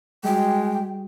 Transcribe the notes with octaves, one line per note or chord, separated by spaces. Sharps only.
G3 G#3 F#4 G5